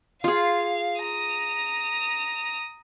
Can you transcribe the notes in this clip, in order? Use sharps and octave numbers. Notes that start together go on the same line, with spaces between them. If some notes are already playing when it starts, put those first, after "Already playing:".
F4 G#4 F5
A#5 D#6